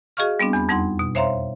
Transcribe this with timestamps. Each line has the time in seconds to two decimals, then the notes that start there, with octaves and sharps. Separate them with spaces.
0.17 F#4 G#4 D#5 F5 C#6 F6
0.39 G3 B3 C4 D4
0.53 E2 B5
0.69 F2 G3 D#4 F#5 C6
0.99 B2
1.15 C5 C#5 E5 F5 A#5 C6